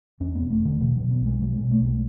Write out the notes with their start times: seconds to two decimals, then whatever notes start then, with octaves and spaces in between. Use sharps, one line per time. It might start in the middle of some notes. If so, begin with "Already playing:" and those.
0.20 E2 C#4
0.35 B3
0.40 E1
0.51 A3
0.60 E1 D3
0.80 B2 E3
0.96 B2 F#3
1.11 B3
1.21 B1 G#3
1.40 B2 F#3
1.56 G#3
1.61 B2
1.71 A3
1.81 B1 G#3